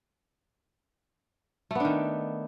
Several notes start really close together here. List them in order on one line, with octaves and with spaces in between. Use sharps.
A3 B3 D4 D#3